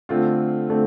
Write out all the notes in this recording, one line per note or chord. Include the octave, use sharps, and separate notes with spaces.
D3 A3 C4 F4
D3 A3 C4 F4